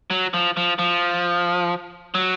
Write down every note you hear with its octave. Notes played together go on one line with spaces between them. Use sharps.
F#3
F3
F3
F3
F#3